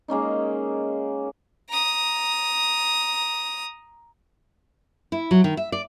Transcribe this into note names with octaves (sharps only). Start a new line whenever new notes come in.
G#3 A#3 C#4 D#4
A#5 D#6
E4
F#3
D#3
E5
D5